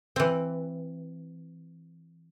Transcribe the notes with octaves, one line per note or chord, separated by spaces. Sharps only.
E3 C4